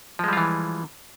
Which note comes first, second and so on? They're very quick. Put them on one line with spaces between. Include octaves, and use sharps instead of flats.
F3 G#3 G3 F4 E3